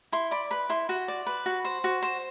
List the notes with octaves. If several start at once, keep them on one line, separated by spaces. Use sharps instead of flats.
E4 C6
D5 B5
B4 B5
E4 C6
F#4
D5
B4
F#4
C5
F#4
C5